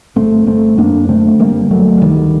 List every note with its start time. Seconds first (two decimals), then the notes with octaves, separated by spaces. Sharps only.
0.16 G1 A3 C4
0.46 G1 A3 C4
0.77 F#2 A#3 D4
1.09 D3 A3 C4
1.40 G1 G3 A#3
1.71 G1 F#3 A3
2.01 D2 D#3 G3